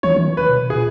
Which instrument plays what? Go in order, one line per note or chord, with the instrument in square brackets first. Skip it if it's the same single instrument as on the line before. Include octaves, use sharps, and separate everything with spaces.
[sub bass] E3 [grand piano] C#5
[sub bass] E3
D#3
[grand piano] B4
[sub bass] B2
[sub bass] A#2 [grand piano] G#4